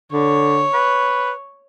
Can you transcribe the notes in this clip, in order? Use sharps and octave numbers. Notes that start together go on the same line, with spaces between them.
D3 C#5
B4